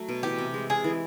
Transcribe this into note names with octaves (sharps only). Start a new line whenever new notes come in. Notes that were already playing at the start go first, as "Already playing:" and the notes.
Already playing: F#3 A3
B2
E3 G4
C3
G#3
C3 G#4
E3